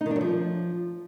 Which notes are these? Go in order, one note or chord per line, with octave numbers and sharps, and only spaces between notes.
D#4
D#3
D4
F#3
F3